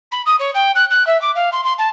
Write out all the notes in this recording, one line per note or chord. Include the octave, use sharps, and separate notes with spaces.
B5
D#6
C#5
G5
F#6
F#6
E5
D6
F5
C6
C6
A5